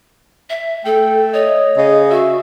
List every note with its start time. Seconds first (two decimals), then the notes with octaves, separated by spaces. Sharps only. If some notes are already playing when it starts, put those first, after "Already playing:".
0.49 E5
0.85 A3 A4 G5
1.34 C#5 D#5
1.77 C#3 D#5
2.10 F#4 E5